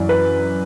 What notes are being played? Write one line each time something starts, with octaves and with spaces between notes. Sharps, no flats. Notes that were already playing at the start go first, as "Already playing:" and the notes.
Already playing: F#2 E3 D5
B4